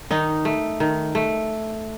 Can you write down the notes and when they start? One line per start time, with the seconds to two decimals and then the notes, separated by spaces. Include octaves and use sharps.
0.11 D#3 D#4
0.45 A3
0.80 D#3
1.15 A3